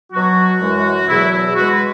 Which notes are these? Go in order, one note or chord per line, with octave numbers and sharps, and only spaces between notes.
B2 F#3 F#4
F#2 E3 G#3
E2 B2 F#3 E4
E4
B2 G#3 F#4
B4